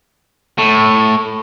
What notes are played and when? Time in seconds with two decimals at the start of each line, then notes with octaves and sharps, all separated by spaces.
0.58 A2